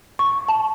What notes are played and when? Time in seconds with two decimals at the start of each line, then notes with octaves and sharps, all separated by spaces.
0.19 C#6
0.49 A5